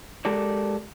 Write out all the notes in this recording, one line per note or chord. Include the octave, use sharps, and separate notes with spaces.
G#3 G4 A4 A#4 D5